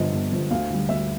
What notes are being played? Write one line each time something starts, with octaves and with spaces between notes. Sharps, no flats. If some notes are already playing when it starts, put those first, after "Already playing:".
Already playing: G1 G2 D3 F3 D#5
G1
G2 D3 F3
D2 F5
D3 G3
D2 E5